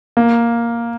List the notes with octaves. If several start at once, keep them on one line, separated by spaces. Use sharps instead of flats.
A#3